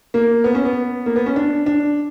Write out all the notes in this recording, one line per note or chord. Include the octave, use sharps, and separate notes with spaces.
A#3
B3
C#4
B3
A#3
B3
C#4
D4
D4